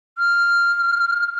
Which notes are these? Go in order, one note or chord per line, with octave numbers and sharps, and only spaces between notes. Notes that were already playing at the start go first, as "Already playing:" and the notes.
F6